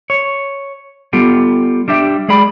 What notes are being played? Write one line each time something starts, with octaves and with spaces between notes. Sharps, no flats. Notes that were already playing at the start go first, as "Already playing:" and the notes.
C#5
G3 B3 F4 G4 A4
G3 D4 G4 E5
G#3 G#4 D5 B5